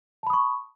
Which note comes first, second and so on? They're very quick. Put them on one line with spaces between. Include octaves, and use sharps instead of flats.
A5 B5 D#6 C#6